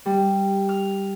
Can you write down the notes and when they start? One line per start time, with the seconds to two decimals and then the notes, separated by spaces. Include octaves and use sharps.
0.06 G3
0.69 F6